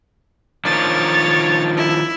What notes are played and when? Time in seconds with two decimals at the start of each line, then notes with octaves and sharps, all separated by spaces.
0.65 D#3 F3 D4 C#5 A6
1.76 E4